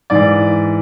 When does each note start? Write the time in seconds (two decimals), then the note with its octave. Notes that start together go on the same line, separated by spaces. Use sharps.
0.10 G#2 E3 D5